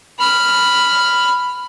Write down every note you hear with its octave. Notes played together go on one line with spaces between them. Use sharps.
B5 F6